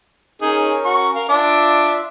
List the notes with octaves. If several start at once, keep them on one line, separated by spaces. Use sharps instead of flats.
C#4 D#4 G#4 A#4
F#4 C#6
A#4 F5
D4 F4 E5 D6